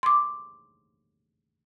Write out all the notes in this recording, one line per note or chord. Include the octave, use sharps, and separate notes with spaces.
C6 D6